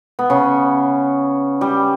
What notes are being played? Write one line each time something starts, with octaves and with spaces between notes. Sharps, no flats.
B3
C#3 C#4
G3 G4